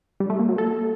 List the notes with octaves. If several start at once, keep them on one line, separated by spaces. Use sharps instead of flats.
G3
A3
A#3
F#3
A4